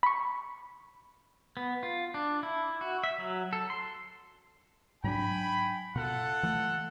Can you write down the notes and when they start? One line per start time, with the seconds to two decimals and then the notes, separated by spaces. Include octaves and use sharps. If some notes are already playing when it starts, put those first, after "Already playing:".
0.03 B5 C#6
1.57 B3
1.83 F4
2.14 D4
2.43 E4
2.81 F#4
3.04 E5
3.18 F#3
3.53 A4
3.70 C6
5.04 G#2 F#3 D4 G5 G#5 B5
5.96 B2 F4 A4 F#5
6.43 E3 A3